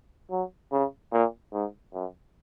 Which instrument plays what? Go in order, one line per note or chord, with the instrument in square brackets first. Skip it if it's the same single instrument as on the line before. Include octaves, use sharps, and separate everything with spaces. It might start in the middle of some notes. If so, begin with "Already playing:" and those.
[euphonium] F#3
C#3
A#2
G#2
F#2